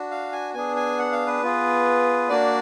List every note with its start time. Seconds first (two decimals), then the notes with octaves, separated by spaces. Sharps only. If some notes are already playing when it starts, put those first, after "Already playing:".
Already playing: D4 F#4
0.11 F5
0.32 G#5
0.54 B3 D4 G#4 G#5
0.76 G#5
0.99 F#5
1.12 F5
1.27 B4
1.42 B3 F4 G#4
2.29 A#3 D4 F#4 D5